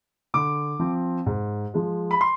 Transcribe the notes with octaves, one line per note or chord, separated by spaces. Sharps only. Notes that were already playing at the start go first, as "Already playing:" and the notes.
D3 D6
F3 C4
G#2
F3 G#3
B5
C6